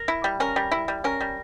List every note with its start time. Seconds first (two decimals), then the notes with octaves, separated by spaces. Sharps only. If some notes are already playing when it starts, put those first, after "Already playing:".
Already playing: A#4
0.08 E4
0.24 G3
0.40 C#4 A#4
0.56 G3
0.72 E4
0.88 G3
1.04 C#4 A#4
1.20 G3